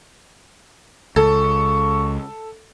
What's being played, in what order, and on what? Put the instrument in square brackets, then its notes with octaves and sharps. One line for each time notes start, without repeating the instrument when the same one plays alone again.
[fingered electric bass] C#2 [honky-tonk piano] A4 [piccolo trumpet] C#6